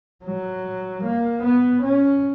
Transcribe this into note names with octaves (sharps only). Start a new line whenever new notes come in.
F#3
A#3
B3
C#4